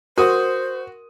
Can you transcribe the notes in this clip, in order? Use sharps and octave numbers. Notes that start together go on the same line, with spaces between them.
F#4 A#4 C5 C6 C#6 D#6